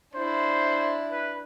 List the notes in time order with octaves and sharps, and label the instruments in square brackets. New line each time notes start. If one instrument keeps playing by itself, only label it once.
[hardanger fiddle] D4 E4 [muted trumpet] C5
[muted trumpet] B4